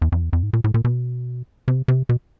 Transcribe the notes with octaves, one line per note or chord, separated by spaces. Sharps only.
E2
F2
E2
F2
G#2
A#2
A2
A#2
B2
C3
C3
B2